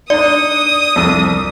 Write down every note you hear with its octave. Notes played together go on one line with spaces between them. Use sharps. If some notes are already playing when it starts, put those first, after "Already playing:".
D4 D#4 D5 D#6
C2 F2 E6